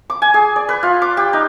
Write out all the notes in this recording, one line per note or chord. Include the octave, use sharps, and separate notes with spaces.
D6
G#5
G#4
D5
B4
F4
D6
G4
D#4